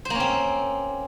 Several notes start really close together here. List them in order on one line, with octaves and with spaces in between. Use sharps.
C5 A#3 C#4 C4